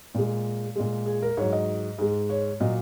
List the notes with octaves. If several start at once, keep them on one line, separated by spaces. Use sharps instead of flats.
A#2 G#3
A#2 G#3
G#4
A#4
G#2 F#3 C#5
D#5
G#2 G#3
C#5
A#2 F#3 D#5